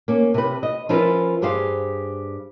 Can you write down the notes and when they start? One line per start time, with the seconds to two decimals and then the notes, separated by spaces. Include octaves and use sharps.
0.08 A#3 C#4
0.34 C3 B4
0.63 D#5
0.89 F3 C#4 E4 F4 A#4 B4
1.42 G2 G4 G#4 C5 F5